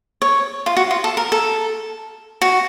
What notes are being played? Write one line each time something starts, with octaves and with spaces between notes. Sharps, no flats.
C#5
F4
F#4
F4
A4
A#4
A4
F#4